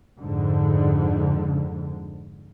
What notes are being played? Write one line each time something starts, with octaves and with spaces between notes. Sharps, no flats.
F2 G#2 D3